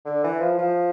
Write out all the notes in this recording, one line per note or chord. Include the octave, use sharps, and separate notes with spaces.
D3
E3
F3
F3